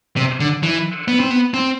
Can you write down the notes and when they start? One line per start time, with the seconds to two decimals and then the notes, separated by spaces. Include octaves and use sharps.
0.17 C3
0.40 D3
0.63 E3
1.08 B3
1.20 C4
1.30 B3
1.54 C4